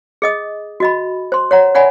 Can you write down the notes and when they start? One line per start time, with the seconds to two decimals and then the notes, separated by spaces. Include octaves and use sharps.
0.22 G#4 D#5 D#6
0.80 F#4 D#5 B5
1.32 C5 C6
1.51 C#5 F#5 A#5
1.75 C#5 D5 F#5 G#5 B5